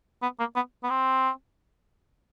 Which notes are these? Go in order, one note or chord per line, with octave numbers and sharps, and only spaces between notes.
B3
A#3
B3
B3
C4